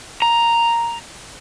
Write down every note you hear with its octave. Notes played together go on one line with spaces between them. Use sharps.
A#5